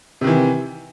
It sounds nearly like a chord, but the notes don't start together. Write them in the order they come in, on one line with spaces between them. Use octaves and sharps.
C3 D#3 E3